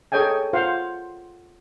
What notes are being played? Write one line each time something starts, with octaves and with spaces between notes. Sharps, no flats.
G#4 A4 C#5 D#5 G5 G#5
F4 C5 F5 F#5